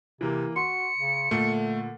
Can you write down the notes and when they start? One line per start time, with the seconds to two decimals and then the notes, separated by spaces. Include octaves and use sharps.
0.21 C3 E3 A#3
0.56 F#4 C6 C#7
0.98 C#3
1.31 A#2 D3 A3